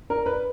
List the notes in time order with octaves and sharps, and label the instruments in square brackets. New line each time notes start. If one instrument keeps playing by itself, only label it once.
[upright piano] A#4
B4